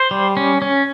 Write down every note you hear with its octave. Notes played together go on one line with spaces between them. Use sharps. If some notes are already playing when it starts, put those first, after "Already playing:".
Already playing: C5
G3
C#4
C#4